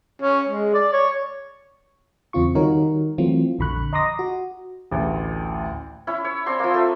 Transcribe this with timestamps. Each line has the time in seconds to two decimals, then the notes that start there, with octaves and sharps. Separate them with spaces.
0.22 C#4
0.49 G#3
0.74 D5
0.93 C#5
2.33 E2 C#3 C4 F4 C#6
2.55 D#3 G3 D#4 F#4 A#4 C#5
3.18 E3 F#3 A3 C4 F4
3.59 A#1 F2 D3 B5 C#6 F#6
3.93 D#5 A#5 C6 D6 D#6 A#6
4.19 F#4
4.91 A1 D2
6.07 C#4 E4
6.25 C#5
6.46 C4 D4 C6
6.59 F3 A#3
6.74 A3